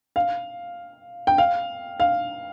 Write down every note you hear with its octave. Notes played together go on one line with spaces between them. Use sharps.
F5
G5
F5
F5